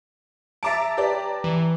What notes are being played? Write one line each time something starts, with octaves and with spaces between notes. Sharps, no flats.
E5 A5 A#5 D6 A6 D7
G4 B4 D5
E3